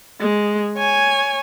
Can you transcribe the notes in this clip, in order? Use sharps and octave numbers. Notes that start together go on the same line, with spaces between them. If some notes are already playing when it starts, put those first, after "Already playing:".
G#3
C#5 G#5